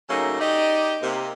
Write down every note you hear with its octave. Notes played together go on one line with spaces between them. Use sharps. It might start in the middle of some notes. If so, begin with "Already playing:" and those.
C#3 F#3 A3 A#3 C#4 D#4
D#4 G4 D5 D#5
C3 A#3